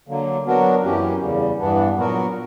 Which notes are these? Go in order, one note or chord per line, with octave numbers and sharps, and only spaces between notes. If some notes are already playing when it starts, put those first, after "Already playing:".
D3 F#3 A#3
F#3 B3 D4 F#4 A#4
F#2 E3 A#3 C#4 G4
E2 C#3 G3
G2 E3 B3 D4
A#2 F#3 B3 F#4 A#4